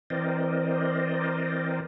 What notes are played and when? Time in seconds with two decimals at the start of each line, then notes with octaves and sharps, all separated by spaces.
0.10 E3 C4 A#4 C5 D5 D#5